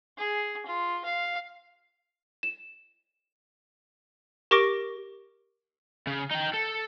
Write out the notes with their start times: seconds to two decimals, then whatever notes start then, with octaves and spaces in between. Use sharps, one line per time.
0.18 G#4
0.66 F4
1.05 F5
2.43 E7
4.51 G4 A#4 C#6 D6 A#6 D7
6.07 C#3
6.31 D#4 G5
6.54 A4